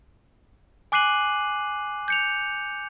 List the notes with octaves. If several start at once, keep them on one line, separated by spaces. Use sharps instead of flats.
G#5 D6 F#6 C7 D#7 F#7
G6 C#7 F7